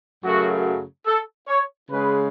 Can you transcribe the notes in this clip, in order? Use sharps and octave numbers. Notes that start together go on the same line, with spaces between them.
F#2 C#3 F#3 A3 F#4
A4
C#5
C#3 G#3 B4